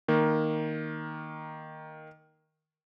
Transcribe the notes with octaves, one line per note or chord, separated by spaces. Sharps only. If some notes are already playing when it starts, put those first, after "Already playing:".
D#3 A#3